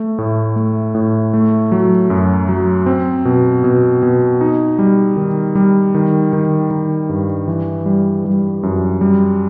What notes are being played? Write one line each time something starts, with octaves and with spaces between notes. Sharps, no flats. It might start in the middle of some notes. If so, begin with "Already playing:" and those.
Already playing: A3
A2
A3
A2
A3
F#3
F#2
F#3
C4
B2
B2
B2
D#4
G3
D#3
G3
D#3
D#3
D#3
G2
E3
G3
G3
F#2
G3